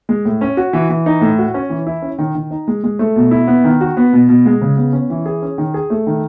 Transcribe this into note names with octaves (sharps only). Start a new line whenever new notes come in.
G#3
A2
C#4
F#4
E3
E3
D#4
A2
F#4
C#4
E3
E4
C#4
D#3
D#3
D#4
G#3
G#3
A3
B2
E4
B3
D#3
F#4
B3
B2
B2
G#3
C#3
B3
C#4
E3
G#4
C#4
D#3
G#4
A3
D#3